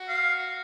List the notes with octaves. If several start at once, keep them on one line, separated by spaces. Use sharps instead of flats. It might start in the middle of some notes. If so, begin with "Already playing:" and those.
Already playing: F#4
F5